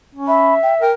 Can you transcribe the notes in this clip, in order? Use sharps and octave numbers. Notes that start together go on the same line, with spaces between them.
C#4
E5 B5
G5
A#4 G5